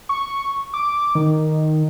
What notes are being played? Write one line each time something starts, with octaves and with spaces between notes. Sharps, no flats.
C#6
D6
D#3